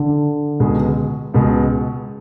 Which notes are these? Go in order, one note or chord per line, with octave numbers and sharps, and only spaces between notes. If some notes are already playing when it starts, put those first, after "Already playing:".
Already playing: D3
C#2 B2 G#3
C#2 B2 G#3